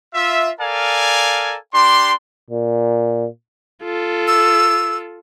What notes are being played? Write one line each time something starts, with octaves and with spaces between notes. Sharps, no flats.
F4 E5
A4 A#4 D5 F5 G#5
D4 G4 C6
A#2
F4 A4
E6